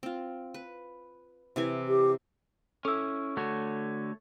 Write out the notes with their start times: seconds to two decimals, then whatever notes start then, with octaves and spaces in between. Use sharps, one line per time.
0.03 C4 F4
0.54 B4
1.56 C3 E3 G#5
1.88 G4
2.85 C#4 E4 A4 E6
3.37 D3 A3 F#4 C#5